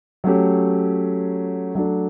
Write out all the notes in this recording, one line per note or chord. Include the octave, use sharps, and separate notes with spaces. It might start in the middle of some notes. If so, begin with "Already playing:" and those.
F#3 A3 C#4 G4
F#3 A3 D4 A4